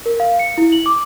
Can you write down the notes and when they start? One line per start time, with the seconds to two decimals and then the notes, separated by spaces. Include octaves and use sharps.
0.06 A#4
0.20 F5
0.39 C#7
0.58 E4
0.72 F#7
0.86 D6